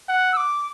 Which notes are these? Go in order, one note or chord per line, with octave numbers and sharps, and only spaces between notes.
F#5
E6
D6